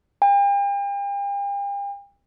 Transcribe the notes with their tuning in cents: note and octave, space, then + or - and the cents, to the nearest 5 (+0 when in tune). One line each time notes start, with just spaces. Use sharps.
G5 +40